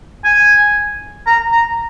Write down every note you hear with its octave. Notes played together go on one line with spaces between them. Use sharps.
G#5
A#5
A#5